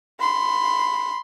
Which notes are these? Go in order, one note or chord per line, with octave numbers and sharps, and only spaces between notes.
B5 C6